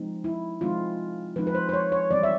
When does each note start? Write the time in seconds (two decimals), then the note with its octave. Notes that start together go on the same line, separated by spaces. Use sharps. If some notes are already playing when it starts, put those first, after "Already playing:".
Already playing: F3 G#3 C4 D#4
0.24 E4
0.61 F3 G#3 C4 D#4 F4
1.36 F3 G#3 C4 D#4 B4
1.47 B4
1.55 C5
1.69 C5
1.73 C#5
1.92 C#5
2.10 E3 G3 C4 D5
2.23 E5